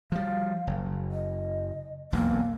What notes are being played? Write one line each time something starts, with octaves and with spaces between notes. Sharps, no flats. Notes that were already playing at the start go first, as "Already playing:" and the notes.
F3 G3 F5
F#1
D#5
E1 B1 F2 A#3